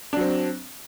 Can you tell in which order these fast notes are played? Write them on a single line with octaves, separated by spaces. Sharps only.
D4 F#3 C4